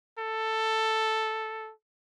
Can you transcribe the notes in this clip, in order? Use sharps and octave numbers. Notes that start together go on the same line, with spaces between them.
A4